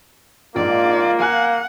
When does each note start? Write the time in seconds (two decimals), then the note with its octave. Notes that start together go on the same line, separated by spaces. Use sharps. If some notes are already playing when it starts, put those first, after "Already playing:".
0.56 A#1 G#2 A#3 F4 D5
1.20 F5 F#5 G#5 F#6